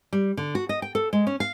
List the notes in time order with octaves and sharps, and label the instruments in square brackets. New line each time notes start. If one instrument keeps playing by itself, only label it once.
[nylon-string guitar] G3
D3
F#4
D#5
G5
A4
G#3
C#4
F5